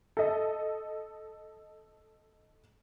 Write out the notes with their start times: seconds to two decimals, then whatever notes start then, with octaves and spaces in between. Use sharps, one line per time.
0.17 A4 D#5